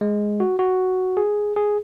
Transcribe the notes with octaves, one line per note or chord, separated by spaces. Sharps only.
G#3
F#4
F#4
G#4
G#4